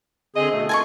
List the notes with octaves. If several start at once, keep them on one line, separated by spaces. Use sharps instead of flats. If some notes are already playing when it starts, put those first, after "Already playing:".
D3 C4 G#4 D#5
B2 A3
F4 G#5 A5 C#6